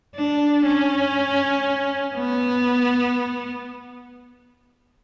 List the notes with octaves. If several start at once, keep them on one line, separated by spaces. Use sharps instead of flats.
D4
C#4
B3